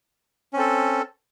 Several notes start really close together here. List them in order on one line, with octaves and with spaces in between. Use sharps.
C#4 C4 A4